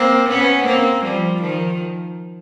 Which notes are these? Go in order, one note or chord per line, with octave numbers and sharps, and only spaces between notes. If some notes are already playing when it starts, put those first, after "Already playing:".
Already playing: A#3 C4
B3 C#4
A#3 C4
F3 G3
D#3 F3